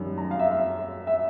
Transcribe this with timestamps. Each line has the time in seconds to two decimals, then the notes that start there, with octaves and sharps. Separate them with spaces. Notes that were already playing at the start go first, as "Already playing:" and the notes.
Already playing: F#2 D#3 G3
0.18 A#5
0.31 F5
0.39 E5
1.07 E5